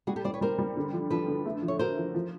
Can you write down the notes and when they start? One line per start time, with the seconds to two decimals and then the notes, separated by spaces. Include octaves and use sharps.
0.07 G3 F#4 G#4
0.16 G4 A4
0.24 G3 C5 D5
0.34 B4 C#5
0.41 G3 A#4 C5
0.58 G3
0.77 D3
0.93 F3
1.10 F3 A4 B4
1.28 D3
1.45 A3
1.62 F3
1.68 C#5
1.79 F#4 A#4 C5
1.97 F3
2.14 F3